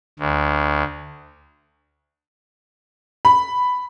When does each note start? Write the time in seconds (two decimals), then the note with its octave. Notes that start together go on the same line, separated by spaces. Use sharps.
0.19 D2
3.25 B5